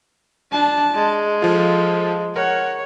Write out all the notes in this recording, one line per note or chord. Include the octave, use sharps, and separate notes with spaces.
D4 A5
G#3
F3 F4 A4
A#4 C#5 F#5